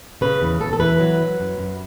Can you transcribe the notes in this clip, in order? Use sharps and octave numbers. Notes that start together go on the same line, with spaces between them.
C#3 B4
E2
E2 A4
A4
E3 B4
F#3
F#3
F#2
F#2